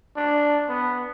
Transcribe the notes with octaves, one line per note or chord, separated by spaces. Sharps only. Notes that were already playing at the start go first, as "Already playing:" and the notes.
D4
B3